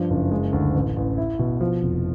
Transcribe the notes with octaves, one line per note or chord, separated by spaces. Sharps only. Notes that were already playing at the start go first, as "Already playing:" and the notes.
Already playing: G2 F3
F#1
G#3
D2
A1
A1
E4
B2
F3
F1